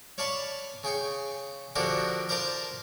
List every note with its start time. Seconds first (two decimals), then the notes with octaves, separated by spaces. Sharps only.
0.18 C#5 D5 F5 A5 B5 C#6
0.83 C#3 G#4 G5 C#6
1.75 D3 F3 D4 F#4 G4 A#4
2.29 A#4 C5 D5 F5 A5 C6